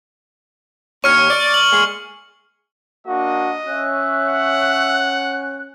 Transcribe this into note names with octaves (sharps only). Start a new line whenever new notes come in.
D#2 C#5 C#6 F6 C#7
D5
F#7
G#3 A#3
A#3 D4 F#4 D#5
C#4 C#5 E5 F#6
F#5